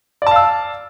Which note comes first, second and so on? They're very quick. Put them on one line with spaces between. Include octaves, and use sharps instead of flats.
D5 A5 F5 E6